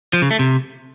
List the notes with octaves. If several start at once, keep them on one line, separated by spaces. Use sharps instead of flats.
F3
C#3
A3
C3